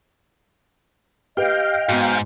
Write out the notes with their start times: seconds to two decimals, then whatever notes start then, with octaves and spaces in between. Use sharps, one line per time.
1.37 G4 B4 D#5 F5 G5
1.89 G#2 B3 F#4